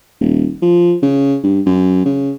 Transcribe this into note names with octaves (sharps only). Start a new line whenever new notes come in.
D#1
F3
C#3
G2
F#2
C#3